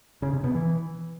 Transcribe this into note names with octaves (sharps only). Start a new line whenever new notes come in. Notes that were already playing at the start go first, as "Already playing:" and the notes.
C#3
C3
B2
E3